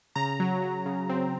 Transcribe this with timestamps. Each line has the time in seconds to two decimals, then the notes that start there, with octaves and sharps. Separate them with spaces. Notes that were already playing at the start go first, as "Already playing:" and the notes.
0.16 C#3 A#5
0.40 F#3
0.62 F#3
0.86 C#3
1.09 C4